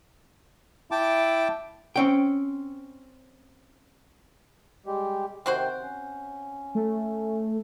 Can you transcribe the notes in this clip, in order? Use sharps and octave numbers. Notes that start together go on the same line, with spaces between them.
E4 G5 A5 D6
C4 C#4 G5
G3 G#3 G4
C3 D#3 C4 F#4 C5 G5
C#4
A3